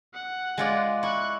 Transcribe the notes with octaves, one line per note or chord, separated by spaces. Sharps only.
F#5
G#3 F4 D5
E4 C#6 F#6